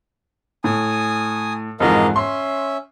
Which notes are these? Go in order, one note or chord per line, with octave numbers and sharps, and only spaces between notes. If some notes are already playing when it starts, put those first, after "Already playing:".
A2 G#5 D#6
F2 G#2 E3 A#4 D#5 F5
C#4 E5 C6